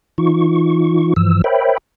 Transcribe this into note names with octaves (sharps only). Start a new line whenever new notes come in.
E3 D#4 F4 C#6
G2 E3 F3 E6
A#4 C5 C#5 E5 G5 B5